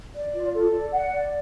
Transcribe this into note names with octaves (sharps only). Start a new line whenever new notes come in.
D5
F4
A4
D5
F#5
D5